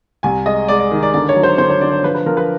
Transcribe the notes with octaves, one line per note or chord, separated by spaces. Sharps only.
C2 G#5
G#3 D#5
G#3 D5
D5
D#3
D5
D3 D5
C#5
F#3
C5
D3 C5
C#5
D3 D5
C#5
F3 B4
B4
F3 A#4
B4